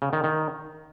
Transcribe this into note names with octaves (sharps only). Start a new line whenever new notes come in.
C#3
D#3
D#3